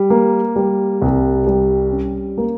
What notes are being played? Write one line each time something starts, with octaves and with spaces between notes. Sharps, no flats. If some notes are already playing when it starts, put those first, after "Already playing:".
Already playing: G3
A#3
G3
C2
G3
C#4
A#3